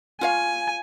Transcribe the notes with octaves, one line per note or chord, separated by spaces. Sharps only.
F4 C#5 F5 G#5